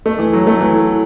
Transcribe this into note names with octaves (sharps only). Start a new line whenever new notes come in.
A3
E3
F#3
A3
E3